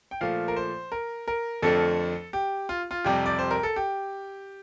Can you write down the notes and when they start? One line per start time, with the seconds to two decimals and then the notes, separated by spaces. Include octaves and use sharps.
0.11 G5
0.21 A#2 F3 A3 F5
0.48 A#4
0.56 C5
0.92 A#4
1.28 A#4
1.62 F2 D3 F3 A3 A4
2.33 G4
2.69 F4
2.91 F4
3.04 F2 C3 G3 G4
3.26 D5
3.39 C5
3.51 A#4
3.63 A4
3.76 G4